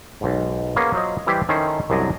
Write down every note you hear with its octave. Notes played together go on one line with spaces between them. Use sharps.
B1 G#2
A#3 B3 C#4 G#4
F#3 F4 C5 D#5
E3 G3 E4 G4 B4 C5
D#3 C#4 E4 A4 C5
C2 F#2 F#3 D4 D#5 G#5